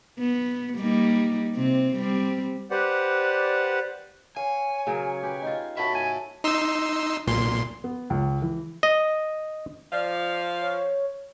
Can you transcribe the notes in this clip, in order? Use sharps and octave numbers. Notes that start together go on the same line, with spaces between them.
B3
G3 A#3 D#4
C3 C4
G3 C4
G4 B4 C5 D5 F#5
C#5 F5 G#5
C#3 F#3 A#4
G4 B4
D#4 F4
F#4 C#5 E5 A5 B5
G#5
D#4 C6 E6
B1 A#2 C6
B3
C#2
E3
D#5
F3 D5 F5
C#5